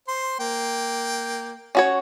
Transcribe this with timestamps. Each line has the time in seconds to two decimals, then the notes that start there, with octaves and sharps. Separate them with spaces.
0.08 C5 C6
0.39 A#3 G5
1.75 C#4 F#4 C#5